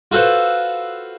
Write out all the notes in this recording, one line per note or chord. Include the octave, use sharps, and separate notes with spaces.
F4 F#4 A4 B4 C5